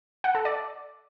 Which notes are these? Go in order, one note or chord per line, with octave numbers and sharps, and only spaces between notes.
F#5
A4
D5